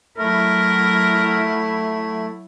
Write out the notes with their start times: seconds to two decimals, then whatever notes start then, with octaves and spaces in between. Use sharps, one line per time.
0.18 F#3 A3 E4 A#4